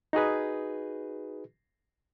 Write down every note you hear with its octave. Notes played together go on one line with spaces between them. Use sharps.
D#4 F#4 G#4 B4